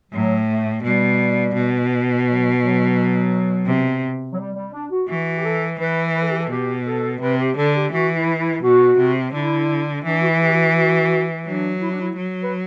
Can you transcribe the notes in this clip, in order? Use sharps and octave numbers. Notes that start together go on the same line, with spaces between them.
A2 F#3
A3
B2 G3
B2
F#3
F#3
C3
F#3
G3
G3
D4
F#4
E3 F#4
G4
A4
E3 B4
B4
A4
G4
A4
B2 G4
A4
C3 B4
G4
D3 A4
G4
E3 F#4
E4
E4
B2 F#4
C3
D3 E4
E3 D4
F#4
E4
G4
F#4
F#4
F#3 D4
E4
D4
E4
F#3
B4